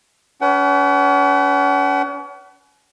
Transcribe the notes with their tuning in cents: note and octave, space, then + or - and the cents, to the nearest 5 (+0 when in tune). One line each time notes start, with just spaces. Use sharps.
C#4 +40 B4 +0 F#5 +40